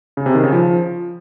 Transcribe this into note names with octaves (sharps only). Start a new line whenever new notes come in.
C#3
C3
D#3
C#3
F3